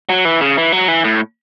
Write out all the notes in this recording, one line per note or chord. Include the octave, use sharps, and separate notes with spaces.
F#3
E3
C#3
E3
F#3
E3
A2